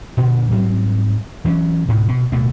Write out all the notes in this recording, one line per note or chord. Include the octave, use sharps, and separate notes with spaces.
A#2 D3
G#2 F#3 G3 C4
E3 F#3 G#3 C#4
D2 G#2 B2
B2
D1 B2 A3